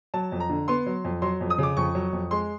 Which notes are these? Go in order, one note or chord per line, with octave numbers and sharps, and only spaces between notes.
F#3 A5
F2
A#5
D3
B3 C6
F#3
F2
F#3 C6
F2
D#6
C#3 D6
F2 C#6
F#3
F2
G#3 C6